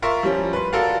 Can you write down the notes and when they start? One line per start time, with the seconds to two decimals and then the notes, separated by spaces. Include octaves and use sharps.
0.02 F4 A#4 E5 C6 C#6
0.23 F3 G3 C#4
0.53 B4 C6
0.73 F4 F#4 A4 A#4 D5 F5